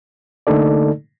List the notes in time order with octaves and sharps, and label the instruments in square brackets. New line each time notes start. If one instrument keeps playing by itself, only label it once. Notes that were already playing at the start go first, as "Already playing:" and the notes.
[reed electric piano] D3 A3 A#3 D#4 A4 D5